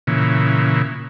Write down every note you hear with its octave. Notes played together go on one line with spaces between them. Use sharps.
A#2 C#3 E3